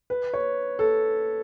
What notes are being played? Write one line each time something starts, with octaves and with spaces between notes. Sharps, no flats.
B4
C#5
A4